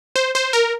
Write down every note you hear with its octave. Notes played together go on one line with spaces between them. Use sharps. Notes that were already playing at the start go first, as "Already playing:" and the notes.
C5
C5
A#4